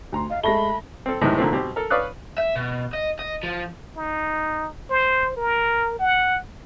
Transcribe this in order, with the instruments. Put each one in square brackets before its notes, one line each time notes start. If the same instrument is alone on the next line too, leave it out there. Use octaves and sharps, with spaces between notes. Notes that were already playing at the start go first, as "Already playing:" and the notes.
[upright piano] D2 A#5 C6
[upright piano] D#5 [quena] F5
[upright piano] G#3 A#6 G7 [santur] A3 [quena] B5
[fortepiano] C4 A4
A2 C3 D#3 E3 G#3
A#2 D3 D#3 F3 A3 C4
B2 C4 G4
A4 A#4
B4 C#5 D5 F5 D#6 F#6
[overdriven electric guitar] E5
B2
D#5
D#5
F3
[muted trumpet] D#4
C5
A#4
F#5